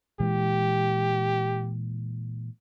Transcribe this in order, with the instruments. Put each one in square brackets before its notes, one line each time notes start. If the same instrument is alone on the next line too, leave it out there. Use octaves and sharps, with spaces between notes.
[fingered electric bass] A#2 E3 G#3 [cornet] G4